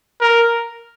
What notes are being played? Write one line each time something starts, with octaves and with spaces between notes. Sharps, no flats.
A#4